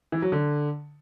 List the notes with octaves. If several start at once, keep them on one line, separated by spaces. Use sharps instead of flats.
E3
F#3
D3